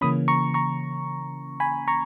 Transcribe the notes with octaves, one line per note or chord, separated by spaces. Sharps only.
C#3 E3 A#3 C#4 B5 D#6
A#5 C#6
A#5 C#6
G#5 B5
A#5 C#6